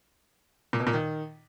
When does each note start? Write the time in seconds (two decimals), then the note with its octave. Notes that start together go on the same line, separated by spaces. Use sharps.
0.73 A#2
0.80 B2
0.87 A#2
0.93 D#3